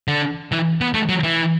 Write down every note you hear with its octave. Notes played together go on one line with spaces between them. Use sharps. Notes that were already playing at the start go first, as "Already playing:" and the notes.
D3
E3
B3
A3
F#3
E3